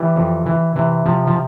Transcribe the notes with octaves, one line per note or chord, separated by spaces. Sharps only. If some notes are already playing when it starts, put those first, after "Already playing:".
Already playing: E3 G3
F2
E3
C3 E3
C3 F3
F3